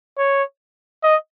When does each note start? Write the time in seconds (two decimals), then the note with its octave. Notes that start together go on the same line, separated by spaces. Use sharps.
0.18 C#5
1.03 D#5